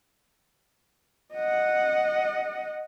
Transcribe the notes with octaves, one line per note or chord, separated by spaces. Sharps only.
D#5 F#5